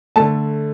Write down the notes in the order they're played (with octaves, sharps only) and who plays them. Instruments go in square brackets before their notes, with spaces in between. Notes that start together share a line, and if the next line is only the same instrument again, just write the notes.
[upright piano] D3 A3 A5